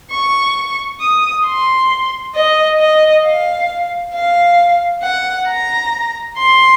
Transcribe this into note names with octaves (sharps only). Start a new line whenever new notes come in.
C#6
D#6
C6
D#5
D#5
F5
F5
F#5
A#5
C6